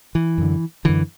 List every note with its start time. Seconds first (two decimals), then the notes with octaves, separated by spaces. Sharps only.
0.15 E3
0.38 F#2 D3
0.85 F#2 D3 E3